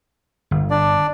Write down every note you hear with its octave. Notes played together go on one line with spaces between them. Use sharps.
G1
D4 D5